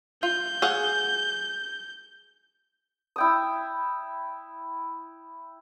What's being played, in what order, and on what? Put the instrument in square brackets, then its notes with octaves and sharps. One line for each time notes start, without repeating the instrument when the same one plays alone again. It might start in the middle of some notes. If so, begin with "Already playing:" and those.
[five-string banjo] F4 [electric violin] G6
[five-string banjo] G#4 F5 F#5
[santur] E4 G5 D#6